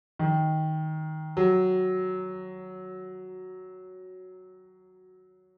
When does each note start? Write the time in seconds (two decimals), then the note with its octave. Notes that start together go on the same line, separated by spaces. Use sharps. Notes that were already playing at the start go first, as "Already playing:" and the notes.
0.19 D#3
1.37 F#3